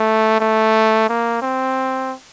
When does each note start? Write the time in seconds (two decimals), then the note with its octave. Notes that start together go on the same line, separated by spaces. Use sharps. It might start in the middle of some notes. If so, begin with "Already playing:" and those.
Already playing: A3
0.40 A3
1.09 A#3
1.42 C4